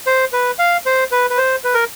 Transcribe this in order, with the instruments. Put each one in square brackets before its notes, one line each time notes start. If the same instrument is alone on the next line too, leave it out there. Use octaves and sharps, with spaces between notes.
[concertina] C5
B4
F5
C5
B4
B4
C5
B4
A#4